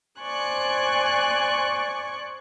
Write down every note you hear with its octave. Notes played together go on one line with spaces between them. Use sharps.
C5 D5 G#5 C#6 F#6